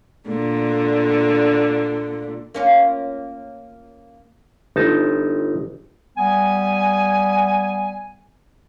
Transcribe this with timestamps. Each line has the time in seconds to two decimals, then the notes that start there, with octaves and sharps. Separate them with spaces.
0.27 A#2 D3
2.54 A#3 C#4 F4
4.76 G1 D#4 A5
6.17 G3 B3 G#5